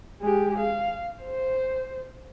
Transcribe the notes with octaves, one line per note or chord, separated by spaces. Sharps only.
G#3 G4
F5
C5